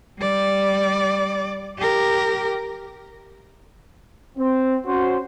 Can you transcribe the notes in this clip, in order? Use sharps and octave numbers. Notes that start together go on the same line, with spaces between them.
G3 D5
G4 A#4
C4
C#4 F#4 C5